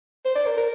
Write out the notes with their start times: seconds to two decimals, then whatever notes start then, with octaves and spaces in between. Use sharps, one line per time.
0.25 C5
0.35 D5
0.46 A#4
0.57 A#4